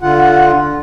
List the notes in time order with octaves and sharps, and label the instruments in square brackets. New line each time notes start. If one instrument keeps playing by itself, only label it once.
[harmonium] D3 F4 F#5